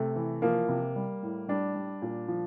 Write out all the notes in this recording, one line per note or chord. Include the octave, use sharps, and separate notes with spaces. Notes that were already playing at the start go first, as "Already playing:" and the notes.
Already playing: C3 A3
E3
F3 A#3
C3
G3
A2
G3 D4
G3
A#2
F3